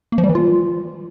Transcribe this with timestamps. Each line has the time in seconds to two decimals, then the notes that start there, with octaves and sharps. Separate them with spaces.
0.12 A#3
0.18 F3
0.24 G3
0.29 E3
0.35 F4